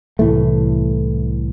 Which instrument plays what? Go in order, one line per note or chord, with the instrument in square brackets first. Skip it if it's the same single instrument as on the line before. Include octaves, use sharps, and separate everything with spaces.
[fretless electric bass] C2 A2 E3 A3